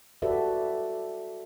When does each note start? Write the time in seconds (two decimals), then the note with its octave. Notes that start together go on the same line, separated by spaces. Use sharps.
0.22 F#4 G4 A4 B4 D5 E5